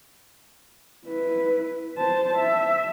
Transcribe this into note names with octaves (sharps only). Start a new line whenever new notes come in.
E4 B4
C5 A5
E5